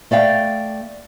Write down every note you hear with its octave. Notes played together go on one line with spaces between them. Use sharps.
A3 D5 F5 G5